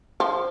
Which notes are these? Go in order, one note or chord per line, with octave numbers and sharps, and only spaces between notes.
F3